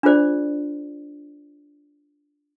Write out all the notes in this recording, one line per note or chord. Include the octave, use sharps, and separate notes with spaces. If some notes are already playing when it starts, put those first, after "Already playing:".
D4 F4 G#4 C5 D5